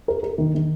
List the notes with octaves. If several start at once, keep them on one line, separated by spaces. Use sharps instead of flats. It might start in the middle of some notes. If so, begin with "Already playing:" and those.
A#4
A#4
D#3
D#3